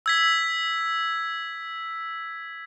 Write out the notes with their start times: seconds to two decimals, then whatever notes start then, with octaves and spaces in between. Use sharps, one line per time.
0.06 E6 G#6 B6